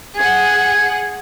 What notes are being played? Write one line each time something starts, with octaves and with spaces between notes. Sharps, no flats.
G#4 F#5 G#6